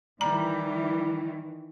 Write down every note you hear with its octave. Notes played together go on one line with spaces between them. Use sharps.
D#3 E3 G3 A#5